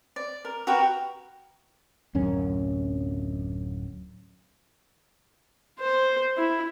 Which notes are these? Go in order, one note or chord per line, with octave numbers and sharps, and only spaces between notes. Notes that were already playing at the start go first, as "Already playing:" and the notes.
D5
A#4
F#4 G4 A#4 B4
D1 F#2 C#4
C5
E4